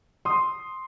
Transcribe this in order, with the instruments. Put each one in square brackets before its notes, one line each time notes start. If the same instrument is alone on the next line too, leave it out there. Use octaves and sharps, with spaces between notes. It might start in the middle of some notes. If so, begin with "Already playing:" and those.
[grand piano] C6 D#6